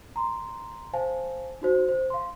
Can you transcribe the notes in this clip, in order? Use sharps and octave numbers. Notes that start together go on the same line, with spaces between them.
A#5 C6
C5 F5 G#5 A5
D#4 F#4 C5
C5
F5 C6